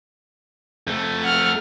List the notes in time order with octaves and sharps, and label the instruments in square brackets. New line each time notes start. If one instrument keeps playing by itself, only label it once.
[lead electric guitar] F2 A3
[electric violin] F#5 F6